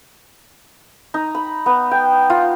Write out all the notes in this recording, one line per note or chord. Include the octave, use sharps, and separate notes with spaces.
D#4
B5
B3
G5
F4